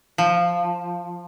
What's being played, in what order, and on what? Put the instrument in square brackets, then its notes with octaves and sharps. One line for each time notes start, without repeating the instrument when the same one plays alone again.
[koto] F3